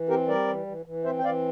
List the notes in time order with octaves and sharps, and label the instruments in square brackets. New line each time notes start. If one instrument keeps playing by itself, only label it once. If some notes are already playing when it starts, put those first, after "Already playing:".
Already playing: [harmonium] E3
C4 G4 A#4
G3 A#4 D5
E3
E3
E3
C4 C5 E5
G5
E3 D5 F5